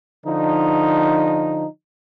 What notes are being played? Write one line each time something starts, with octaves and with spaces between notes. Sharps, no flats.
D3 F3 D#4